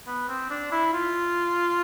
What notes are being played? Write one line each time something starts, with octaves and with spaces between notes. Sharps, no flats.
B3
C4
D4
E4
F4